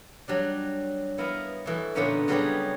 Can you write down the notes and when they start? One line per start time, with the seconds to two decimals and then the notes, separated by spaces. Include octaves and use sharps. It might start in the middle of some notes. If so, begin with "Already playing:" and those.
0.28 F#3 G3 D4
1.18 B3 E4 A#4 D#5 F5
1.66 B2 E3 A3
1.95 A#2 D3 A#3 B3 C#4 D#4
2.28 C#3 F#3 G3 B3 G4 G#4